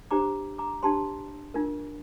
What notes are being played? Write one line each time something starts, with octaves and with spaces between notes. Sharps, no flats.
D4 G4 C5 A#5 D6
A#5 D6
D4 G4 C5 A5 C6
D4 F4 A#4